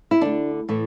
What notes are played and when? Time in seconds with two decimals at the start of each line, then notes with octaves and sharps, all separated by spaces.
0.11 E4
0.21 D3 A3 D4
0.69 A2 E3 A3